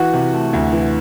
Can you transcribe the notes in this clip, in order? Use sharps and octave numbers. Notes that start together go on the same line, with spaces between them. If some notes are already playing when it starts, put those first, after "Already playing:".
Already playing: E3 F#4
C3
A3
D2
E3